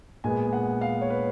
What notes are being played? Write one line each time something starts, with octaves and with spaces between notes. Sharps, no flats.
A#2 G#3 B3 G#5
F#5
F5
C#5
B4